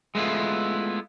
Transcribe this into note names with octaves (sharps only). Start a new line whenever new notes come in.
G#3 A3 B3 E4 F4